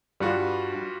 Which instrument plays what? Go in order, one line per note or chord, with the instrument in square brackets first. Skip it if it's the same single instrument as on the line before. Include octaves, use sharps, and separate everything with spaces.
[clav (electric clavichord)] G2 F#5 [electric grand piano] G3 F4 F#4